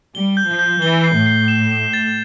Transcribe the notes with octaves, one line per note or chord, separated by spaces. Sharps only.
G3 G7
G6
F3
G6
E3 G7
C7
A2
C7
E7
E7
A6